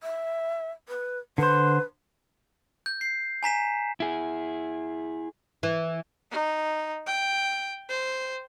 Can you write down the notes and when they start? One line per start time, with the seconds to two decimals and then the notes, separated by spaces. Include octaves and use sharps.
0.03 E5
0.89 B4
1.38 D3 B4 C5
2.86 G6
3.01 C7
3.43 G#5 A#5 B6 E7
4.00 E4 G#4
5.63 E3
6.31 D#4
7.07 G5
7.89 C5